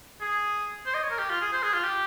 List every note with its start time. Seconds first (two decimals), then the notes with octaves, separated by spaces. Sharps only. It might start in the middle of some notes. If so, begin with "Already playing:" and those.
0.21 G#4
0.86 C5
0.94 D#5
1.03 C#5
1.11 A#4
1.19 G4
1.30 F4
1.41 G#4
1.52 C5
1.63 G#4
1.74 F4
1.84 G4